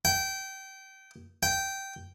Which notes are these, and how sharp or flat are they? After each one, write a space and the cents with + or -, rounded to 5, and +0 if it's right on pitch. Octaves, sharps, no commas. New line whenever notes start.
G5 -20
G5 -10